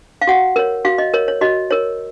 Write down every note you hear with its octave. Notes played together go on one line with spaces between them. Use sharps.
F5
F#4 F#5
A#4 C#5
F#4 F5
D#5
A#4 C#5
C#5
F#4 D#5
A#4 C#5